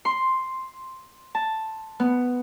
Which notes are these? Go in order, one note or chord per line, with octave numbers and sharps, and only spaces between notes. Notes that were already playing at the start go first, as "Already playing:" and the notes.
C6
A5
B3